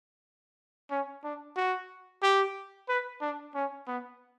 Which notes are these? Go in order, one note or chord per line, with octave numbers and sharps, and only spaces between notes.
C#4
D4
F#4
G4
B4
D4
C#4
B3